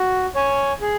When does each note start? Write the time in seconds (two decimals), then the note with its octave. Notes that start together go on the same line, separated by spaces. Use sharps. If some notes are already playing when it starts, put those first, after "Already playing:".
Already playing: F#4
0.35 C#5 G#5
0.81 G#4